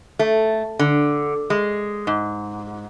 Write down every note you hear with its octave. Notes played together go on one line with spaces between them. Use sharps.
A3
D3
G#3
G#2